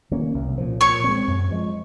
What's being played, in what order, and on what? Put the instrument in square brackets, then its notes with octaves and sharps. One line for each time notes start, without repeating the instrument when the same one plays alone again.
[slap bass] D#3 A#3 C#4
C2
A#2 F3
[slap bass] A#2 [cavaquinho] C#5 C#6
[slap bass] G#3 C4
F#2
F3 G#3